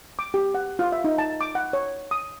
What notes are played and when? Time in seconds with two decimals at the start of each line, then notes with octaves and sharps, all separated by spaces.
0.19 D6
0.34 G4
0.55 F#5
0.79 F4
0.92 E5
1.04 D#4
1.18 A5
1.41 D6
1.55 F#5
1.73 C#5
2.11 D#6